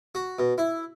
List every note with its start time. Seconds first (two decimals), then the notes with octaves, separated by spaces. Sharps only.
0.15 F#4
0.39 B2
0.58 E4